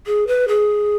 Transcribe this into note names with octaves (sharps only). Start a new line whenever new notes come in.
G#4
B4
G#4